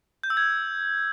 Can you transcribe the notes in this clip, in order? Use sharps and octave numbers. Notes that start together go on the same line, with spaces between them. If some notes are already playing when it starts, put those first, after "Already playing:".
G6
E6
G#6